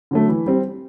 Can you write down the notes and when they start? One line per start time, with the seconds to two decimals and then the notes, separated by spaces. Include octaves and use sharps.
0.11 D3 F#3 A3
0.29 E3
0.46 G3 C4